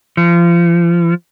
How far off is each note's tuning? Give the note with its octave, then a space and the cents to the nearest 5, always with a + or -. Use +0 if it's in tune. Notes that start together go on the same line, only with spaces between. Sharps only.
F3 -30